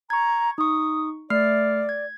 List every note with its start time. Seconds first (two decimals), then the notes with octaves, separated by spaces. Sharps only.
0.10 A#5 C#6 G#6
0.58 D#4 C#6 D#6
1.30 A3 D5 F6 C7
1.89 G#6